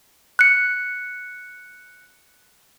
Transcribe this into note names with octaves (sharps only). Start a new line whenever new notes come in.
F#6 C#7